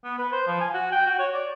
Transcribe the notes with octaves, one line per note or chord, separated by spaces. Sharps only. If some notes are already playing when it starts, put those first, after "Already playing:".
B3
B4
C5
F3
G#5
F#4
G5
F#4
C#5
D5